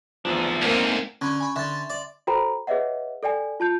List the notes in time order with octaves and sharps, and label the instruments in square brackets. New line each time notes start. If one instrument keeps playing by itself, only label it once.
[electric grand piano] G#1 E2 F3 [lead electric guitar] A3 D4
[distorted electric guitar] D2 G#2 [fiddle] A#3 C4
[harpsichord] D3 [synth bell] C#4 B5 C#6
[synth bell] G#5 B5 C#6
[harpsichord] D3 [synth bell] E5 C6 A6
[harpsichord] D5
[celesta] F#4 A4 C5 G5 A#5 B5
G#4 B4 C#5 D#5 E5 F#5
A4 D5 G5 G#5
F4 A5 G6